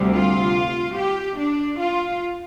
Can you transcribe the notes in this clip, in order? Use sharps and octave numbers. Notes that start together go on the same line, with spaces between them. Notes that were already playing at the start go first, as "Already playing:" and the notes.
Already playing: D2 C3 G3
F4
G4
D4
F4